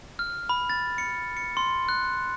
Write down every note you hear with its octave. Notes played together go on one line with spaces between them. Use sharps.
F6
B5
A6
C#7
C#7
C6
F#6